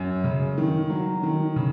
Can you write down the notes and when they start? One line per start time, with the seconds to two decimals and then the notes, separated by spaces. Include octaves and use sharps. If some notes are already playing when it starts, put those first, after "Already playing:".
Already playing: F#2
0.24 C#3
0.58 D#3
0.90 F#3
1.23 D#3
1.56 C#3